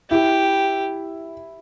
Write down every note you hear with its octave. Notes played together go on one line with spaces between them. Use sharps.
E4 G4